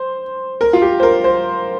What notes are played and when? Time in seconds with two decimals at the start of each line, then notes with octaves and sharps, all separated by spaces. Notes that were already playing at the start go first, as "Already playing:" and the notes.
Already playing: C5
0.61 A#4
0.73 F4
0.82 G4
1.00 C5
1.03 A#4
1.24 C5